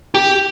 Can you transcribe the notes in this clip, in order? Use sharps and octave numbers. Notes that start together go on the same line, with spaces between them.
G4